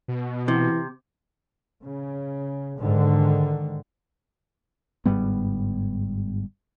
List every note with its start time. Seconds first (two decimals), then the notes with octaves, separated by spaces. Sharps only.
0.08 B2
0.48 C3 E3
1.84 C#3
2.79 G#2 D3 D#3
5.06 G1 G#2 G3 B3